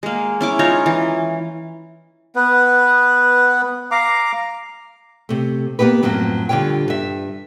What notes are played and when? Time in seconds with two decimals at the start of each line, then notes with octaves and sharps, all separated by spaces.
0.03 G#3 A#3
0.41 C#4 E4 D6
0.59 D#4 F4 C#5 A#5
0.86 E3
2.36 B3 B4
3.91 F5 A#5 D6
5.29 C3 A3
5.79 A#3 B3 D#4 G4 B4
6.02 F#2 A2 F3 F#3 C4
6.49 D3 G3 F4 C#5 G5
6.88 G2 E5